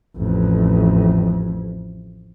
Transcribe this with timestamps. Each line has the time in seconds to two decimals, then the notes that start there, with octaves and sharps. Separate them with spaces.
0.17 A1 F2